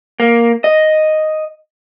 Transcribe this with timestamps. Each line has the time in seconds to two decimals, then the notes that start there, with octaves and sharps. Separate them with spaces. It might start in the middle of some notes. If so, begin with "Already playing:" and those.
0.20 A#3
0.64 D#5